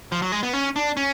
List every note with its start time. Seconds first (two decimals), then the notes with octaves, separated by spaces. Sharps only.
0.12 F3
0.22 F#3
0.32 G#3
0.43 B3
0.53 C#4
0.76 D4
0.97 C#4